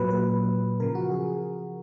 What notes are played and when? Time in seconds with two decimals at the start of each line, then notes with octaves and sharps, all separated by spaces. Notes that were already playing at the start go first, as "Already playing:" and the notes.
Already playing: A#2 F#3 B4
0.10 B4
0.80 C#3 F3 A#4
0.95 F#4
1.11 G#4